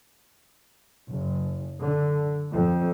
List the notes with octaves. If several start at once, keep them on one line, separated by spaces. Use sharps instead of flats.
F#1
D3
F2